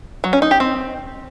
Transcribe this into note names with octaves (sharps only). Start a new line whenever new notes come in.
F#3
C#4
D#4
G4
C4